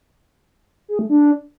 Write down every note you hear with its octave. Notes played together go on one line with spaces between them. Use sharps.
G#4
A3
D4